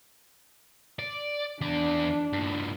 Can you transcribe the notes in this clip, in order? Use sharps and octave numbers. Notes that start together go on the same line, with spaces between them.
D5
E2 D4 D5
G2 A#2